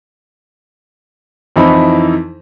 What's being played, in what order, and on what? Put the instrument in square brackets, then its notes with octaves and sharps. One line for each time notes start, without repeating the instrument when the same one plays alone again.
[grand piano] F2 E3 D#4 E4 B5